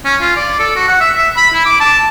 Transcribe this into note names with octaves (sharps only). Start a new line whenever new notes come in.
C#4
F4
D5
A4
F#4
F#5
E5
E5
B5
E4
D6
A5